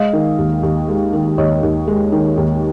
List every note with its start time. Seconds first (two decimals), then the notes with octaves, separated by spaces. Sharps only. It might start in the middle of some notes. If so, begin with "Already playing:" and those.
Already playing: G#3 D#5 F5
0.13 D#3
0.39 D#2
0.63 D#2
0.88 G#3
1.13 D#3
1.38 D#2 C#5 D#5
1.63 D#2
1.88 G#3
2.12 D#3
2.37 D#2